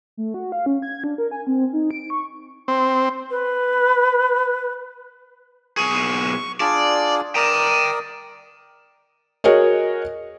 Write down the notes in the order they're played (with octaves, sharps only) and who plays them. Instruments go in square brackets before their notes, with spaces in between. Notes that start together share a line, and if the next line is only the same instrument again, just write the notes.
[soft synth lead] A3
F#4
F5
C#4
G#6
D4
A#4
G#5
C4
D#4
D7
C#6
[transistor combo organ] C4
[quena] B4
[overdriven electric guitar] B1 G#4 [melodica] C#6
[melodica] D4 F4 G#4 [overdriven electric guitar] D5
[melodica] A#4 D5 D#6 [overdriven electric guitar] G5 A#5
[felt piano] F#4 G#4 A#4 C#5 D#5